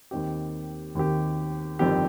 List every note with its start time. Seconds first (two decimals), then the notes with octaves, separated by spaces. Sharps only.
0.11 D#2 D#3 C4 G4
0.95 D#2 D#3 C4 G4
1.79 G1 F2 D#3 C4 G4